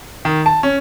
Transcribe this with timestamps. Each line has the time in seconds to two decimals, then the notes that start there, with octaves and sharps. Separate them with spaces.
0.25 D#3
0.46 A5
0.63 C#4